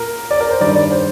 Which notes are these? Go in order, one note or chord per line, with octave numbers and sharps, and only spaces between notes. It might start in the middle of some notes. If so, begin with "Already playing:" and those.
Already playing: A#2 A#4
D5
A#4
C5
G2 D#3 G3 D5
D5
C5